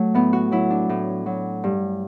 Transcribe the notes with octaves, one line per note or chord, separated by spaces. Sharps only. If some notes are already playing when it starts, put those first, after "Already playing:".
Already playing: F#3 A3
A2 B3
F#4
F#3 E4
D4
A2
F#3
G2